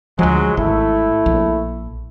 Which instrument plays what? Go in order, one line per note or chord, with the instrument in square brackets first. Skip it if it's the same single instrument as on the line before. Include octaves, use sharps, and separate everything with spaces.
[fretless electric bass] D2 F3 [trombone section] F#3 G#3
[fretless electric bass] G#1 [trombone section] A3 E4
[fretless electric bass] A#1